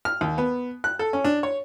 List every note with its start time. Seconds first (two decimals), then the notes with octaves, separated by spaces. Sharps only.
0.05 F6
0.21 D#2
0.38 B3
0.84 F#6
0.99 A4
1.13 C#4
1.25 D4
1.43 C#5